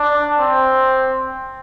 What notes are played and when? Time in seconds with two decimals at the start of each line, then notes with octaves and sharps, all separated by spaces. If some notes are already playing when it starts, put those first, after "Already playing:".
Already playing: D4
0.40 C4